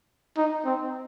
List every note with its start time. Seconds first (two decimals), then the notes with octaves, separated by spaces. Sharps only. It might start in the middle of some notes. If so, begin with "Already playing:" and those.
0.37 D#4
0.65 C4